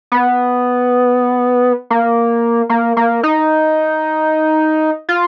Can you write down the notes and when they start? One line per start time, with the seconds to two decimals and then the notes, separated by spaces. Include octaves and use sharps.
0.12 B3
1.90 A#3
2.69 A#3
2.97 A#3
3.23 D#4
5.09 F4